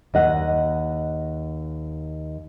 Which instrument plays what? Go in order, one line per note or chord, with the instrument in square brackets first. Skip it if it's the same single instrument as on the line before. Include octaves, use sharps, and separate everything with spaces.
[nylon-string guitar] D#2 D#5 F#5